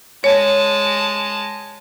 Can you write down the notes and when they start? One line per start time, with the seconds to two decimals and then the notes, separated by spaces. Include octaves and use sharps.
0.24 G#3 C#5 A5